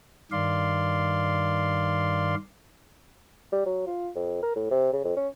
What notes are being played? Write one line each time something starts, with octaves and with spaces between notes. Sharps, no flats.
G2 D#3 D5 F5 C6
G3
F#3
F4
F2
A#4
A2
C3
C#3
F2
C#4